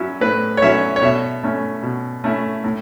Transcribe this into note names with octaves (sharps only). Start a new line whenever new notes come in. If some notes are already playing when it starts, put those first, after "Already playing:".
Already playing: F#3 C#4 E4
A2 B4
C#5
F#3 C#4 E4 E5
C#5
B2 E5
A3 C#4 E4
B2
A3 C#4 E4
A2